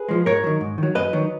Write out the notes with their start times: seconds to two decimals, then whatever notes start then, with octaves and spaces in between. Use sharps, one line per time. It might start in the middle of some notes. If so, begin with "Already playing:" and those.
Already playing: G#4 B4
0.09 F3 G#3
0.26 G#2 A#4 C#5
0.44 D#3 F#3
0.61 G#2
0.78 D#3 F#3
0.95 F#2 B4 D#5
1.13 D#3 F#3